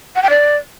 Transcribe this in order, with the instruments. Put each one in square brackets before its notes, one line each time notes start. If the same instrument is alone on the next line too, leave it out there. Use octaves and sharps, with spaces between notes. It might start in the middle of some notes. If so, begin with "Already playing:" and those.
[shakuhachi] F#5
G5
D5